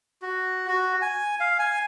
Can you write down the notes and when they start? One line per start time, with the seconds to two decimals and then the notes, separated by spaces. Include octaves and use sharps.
0.22 F#4
0.68 F#4
1.02 G#5
1.40 F5
1.59 G#5